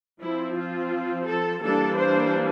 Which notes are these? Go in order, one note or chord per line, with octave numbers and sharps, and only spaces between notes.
F3 C4 E4
F4
A4
E3 G3 A#3 D4 A4
C5